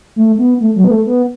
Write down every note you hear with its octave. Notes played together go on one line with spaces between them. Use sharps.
A3
B3
A3
F#3
B3
A3
B3